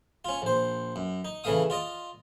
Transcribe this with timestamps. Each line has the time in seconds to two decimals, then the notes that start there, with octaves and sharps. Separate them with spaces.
0.25 C#4 F4
0.42 A#1 C5
0.96 F#2
1.25 D#4
1.44 C#3 E3 A3 F5 D#6
1.70 F4 D5 D#5